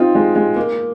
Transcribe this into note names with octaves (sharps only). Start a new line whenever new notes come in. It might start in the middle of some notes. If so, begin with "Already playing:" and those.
Already playing: C4 D#4 F4
G#3
G#3
A#3